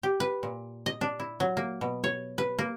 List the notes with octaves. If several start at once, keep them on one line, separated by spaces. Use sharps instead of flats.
G4
B4
A#2
D#5
D4
E4
F#3
A#3
B2
C#5
B4
A#3